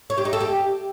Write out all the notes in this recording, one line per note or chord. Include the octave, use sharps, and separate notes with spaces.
C#5
G4
D#4
A4
G4